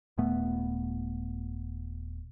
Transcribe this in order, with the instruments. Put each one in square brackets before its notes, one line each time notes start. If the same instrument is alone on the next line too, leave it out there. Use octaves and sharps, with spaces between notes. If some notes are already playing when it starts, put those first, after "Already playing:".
[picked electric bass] D#1 A#2 A3 B3